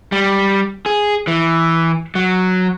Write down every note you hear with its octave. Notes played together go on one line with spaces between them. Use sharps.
G3
G#4
E3
F#3